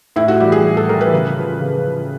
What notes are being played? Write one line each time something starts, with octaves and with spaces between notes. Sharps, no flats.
A2 E4
F#4
E3 G3 G4
G#4
A2
A4
E3 G3 A#4
B4
C#3
F3
C#3
F3